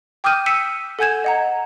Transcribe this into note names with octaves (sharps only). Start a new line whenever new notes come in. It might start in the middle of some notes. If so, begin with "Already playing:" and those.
G5 D6 D#6 F6 G6 D#7
E6 B6 C#7 D#7 E7
A4 F#5 G#5 G6 G#6 E7
D#5 F#5 A#5